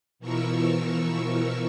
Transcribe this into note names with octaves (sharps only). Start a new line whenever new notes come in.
B2 E3 F3 A#4 C#6 E6